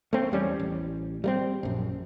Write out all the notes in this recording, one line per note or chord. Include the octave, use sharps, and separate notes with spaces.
A3 C4
E2 G3 C#4
A1
G3 A3 C4
A#1 F#2